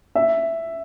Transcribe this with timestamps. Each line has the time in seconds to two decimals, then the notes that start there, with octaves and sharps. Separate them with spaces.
0.15 E5